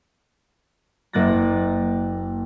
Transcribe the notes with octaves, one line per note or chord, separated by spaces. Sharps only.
F#1 A#3 F#6 A6 A#6